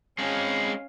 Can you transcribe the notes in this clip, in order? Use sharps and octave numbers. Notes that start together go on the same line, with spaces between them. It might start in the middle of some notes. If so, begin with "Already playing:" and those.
G#3 C4 C#4 F5